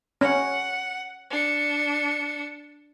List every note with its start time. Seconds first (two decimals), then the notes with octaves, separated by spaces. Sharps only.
0.21 C#4 F#5
1.31 D4 C#7